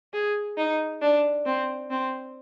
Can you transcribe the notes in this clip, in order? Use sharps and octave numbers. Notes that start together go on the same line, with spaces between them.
G#4
D#4
D4
C4
C4